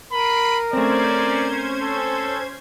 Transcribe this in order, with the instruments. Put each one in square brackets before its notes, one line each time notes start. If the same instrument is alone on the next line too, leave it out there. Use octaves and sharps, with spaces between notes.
[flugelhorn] A#4 [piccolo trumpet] B5 [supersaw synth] C7 D7 D#7
[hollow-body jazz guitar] A3 C4 [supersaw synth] C#4 C5 G#6 [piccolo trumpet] D5
[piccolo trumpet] A4